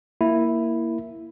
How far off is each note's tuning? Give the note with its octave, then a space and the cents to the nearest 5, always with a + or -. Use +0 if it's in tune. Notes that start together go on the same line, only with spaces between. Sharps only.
A#3 +0 E4 +0